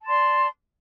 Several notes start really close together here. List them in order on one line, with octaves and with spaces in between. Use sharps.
A5 C6 D5